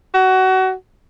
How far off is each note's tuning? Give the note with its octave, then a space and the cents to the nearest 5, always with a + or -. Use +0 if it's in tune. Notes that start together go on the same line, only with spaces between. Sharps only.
F#4 +25